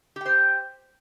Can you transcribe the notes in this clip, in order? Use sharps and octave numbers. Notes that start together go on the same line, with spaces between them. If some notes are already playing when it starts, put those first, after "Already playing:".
G4 C5 G5